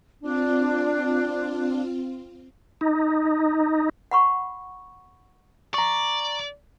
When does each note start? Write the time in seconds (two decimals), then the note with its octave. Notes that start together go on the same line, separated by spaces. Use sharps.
0.22 C4 D4 F4
2.81 D#4
4.11 F#5 B5 C#6
5.74 D5 A#5 C#6